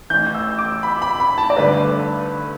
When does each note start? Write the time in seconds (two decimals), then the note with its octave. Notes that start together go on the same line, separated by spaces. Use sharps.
0.10 A1 A2 E3 G6
0.35 E6
0.58 D6
0.83 B5
1.02 B5
1.20 B5
1.38 A5
1.50 D5
1.57 G2 D3 A3 B4